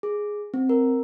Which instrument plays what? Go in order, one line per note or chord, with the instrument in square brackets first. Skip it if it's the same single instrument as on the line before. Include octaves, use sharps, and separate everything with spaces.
[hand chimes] G#4
C4
A#4